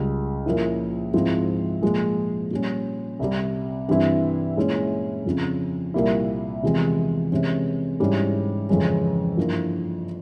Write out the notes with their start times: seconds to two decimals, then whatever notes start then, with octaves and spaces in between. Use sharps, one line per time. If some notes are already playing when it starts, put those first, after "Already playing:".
Already playing: C#2 C#3 G3
0.46 A#2 F3 A#3 C#4 E4
1.14 G#2 F3 C4 E4
1.82 A#2 F3 G#3
2.51 A#2 G3 C#4
3.19 C2 C3 G3
3.88 G2 E3 G3 C4 E4
4.57 A#2 G#3 C#4 E4
5.26 F2 C#3 F3 C4
5.94 C2 A#2 G3 A#3 E4
6.63 E2 C3 F3 G#3 C4
7.32 C3 E3 G#3 C#4
8.00 G#2 G3 C#4 E4
8.69 F2 C#3 E3 G#3 C#4
9.37 G2 F3 A#3 E4